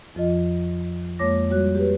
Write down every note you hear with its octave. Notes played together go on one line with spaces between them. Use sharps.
F2 F3 F4 D#5
F2 G#3 A#3 C#5 D6 A#6
G3 F#4 C#5 F#6
G4 B4